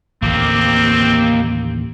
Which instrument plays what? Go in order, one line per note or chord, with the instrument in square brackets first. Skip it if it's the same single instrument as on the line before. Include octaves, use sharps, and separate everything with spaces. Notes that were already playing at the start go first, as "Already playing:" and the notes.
[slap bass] A1 D#2 D3 [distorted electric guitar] A#3 G4 [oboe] C4